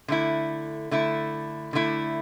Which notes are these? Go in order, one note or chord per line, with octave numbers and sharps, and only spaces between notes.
D3 A3 E4
D3 A3 E4
D3 A3 E4